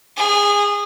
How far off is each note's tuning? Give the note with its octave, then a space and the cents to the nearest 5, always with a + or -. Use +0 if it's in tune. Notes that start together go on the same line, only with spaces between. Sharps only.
G#4 -25